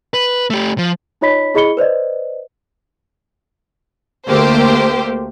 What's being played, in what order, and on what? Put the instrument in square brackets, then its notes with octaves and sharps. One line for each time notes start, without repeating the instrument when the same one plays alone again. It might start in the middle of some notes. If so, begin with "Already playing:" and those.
[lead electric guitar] B4
A3 G4
F3
[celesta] D#4 F4 C#5 D#5 B5 B6
E4 G#4 D#5 B5 C#7 G7
B4 C5 D5 D#5
[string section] D2 A3 A#3 G4 C5